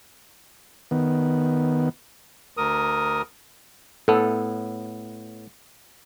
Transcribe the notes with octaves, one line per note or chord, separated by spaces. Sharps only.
D#3 B3
D2 A#4 D#6
A2 B3 A4